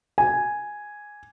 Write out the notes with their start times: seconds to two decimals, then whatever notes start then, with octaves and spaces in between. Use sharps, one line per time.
0.18 G#5